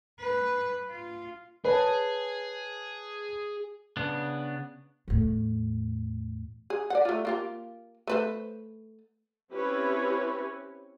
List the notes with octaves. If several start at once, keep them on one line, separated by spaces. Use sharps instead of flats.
B4
F4
G#4 B4 C#5 A5
C#3 B3 D4
E2 A2
G#4
D5 F#5
A3 F4
A#3 F4 G4
A3 B4 C5
C4 C#4 E4 G4 B4 C#5